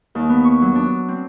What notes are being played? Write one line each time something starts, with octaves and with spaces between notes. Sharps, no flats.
D#2
B3
C#6
F#3
D4
C4